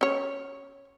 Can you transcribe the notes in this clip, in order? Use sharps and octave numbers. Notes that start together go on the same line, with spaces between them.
C#4 C#5